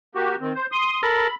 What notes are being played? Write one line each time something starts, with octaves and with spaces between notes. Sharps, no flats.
A#3 F#4 G4
D#3 C4
C5
C6 D#6
A4 A#4 B5